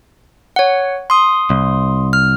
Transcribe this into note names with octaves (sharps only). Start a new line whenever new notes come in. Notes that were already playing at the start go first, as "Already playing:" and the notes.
C#5 F#5
C6 D#6
C2
F6